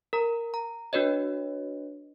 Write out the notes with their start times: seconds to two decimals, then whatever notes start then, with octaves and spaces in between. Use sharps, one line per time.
0.13 A#4 A#5
0.54 A#5
0.93 D4 F#4 B4 C#5 D#5